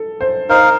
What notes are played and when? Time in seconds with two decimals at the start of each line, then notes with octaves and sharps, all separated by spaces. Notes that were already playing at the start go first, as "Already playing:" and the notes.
Already playing: A4
0.21 C5
0.49 D#4 A#4 C5 F5